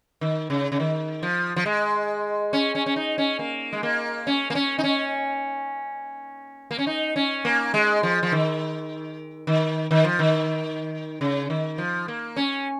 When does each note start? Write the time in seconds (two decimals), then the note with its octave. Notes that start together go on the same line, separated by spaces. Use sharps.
0.21 D#3
0.50 C#3
0.72 C#3
0.80 D#3
1.23 F3
1.56 F3
1.66 G#3
2.53 C#4
2.75 C#4
2.86 C#4
2.96 D#4
3.18 C#4
3.39 A#3
3.73 G#3
3.83 A#3
4.27 C#4
4.50 A#3
4.55 C#4
4.79 D#4
4.84 C#4
6.71 A#3
6.79 C#4
6.87 D#4
7.16 C#4
7.45 A#3
7.74 G#3
8.03 F3
8.23 F3
8.32 D#3
9.47 D#3
9.91 D#3
10.04 F3
10.19 D#3
11.21 C#3
11.50 D#3
11.78 F3
12.08 A#3
12.36 C#4